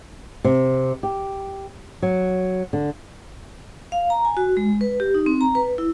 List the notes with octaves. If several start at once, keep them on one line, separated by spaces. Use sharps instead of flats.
C3
G4
F#3
D3
F5
A#5
G#5
F#4
G#3
B4
G4
D#4
C4
A#5
B4
E4